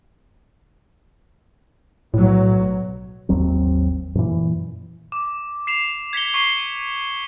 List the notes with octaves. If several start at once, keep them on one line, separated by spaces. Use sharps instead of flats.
B1 A2 F#3
G#1 D#2 F#3 C4
F#2 A#2 E3
D6
C7 E7 F7
G#6 B6 C#7 G7
C#6 C7 G7